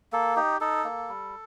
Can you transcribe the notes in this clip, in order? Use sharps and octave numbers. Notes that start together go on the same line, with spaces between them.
A#3 A4
D#4 G4
D#4 A4
A#3
G3